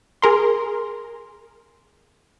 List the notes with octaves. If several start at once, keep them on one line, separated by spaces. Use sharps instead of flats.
G#4 A#4 C6